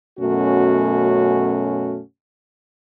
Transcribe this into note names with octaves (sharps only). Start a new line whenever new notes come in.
F#2 B2 A3 C#4 F#4